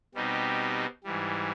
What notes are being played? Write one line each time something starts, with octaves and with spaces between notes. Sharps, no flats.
B2 G3 C4 D#4 G4
G#2 E3 G3